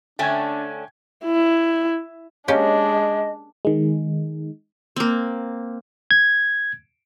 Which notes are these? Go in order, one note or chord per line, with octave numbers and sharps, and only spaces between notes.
D3 A3 C#4 D4 G5 G#5 G#6
E4
G#3 A#3 C#4 D4 G4 D#5
D#3 G#3
A#3 C4
G#6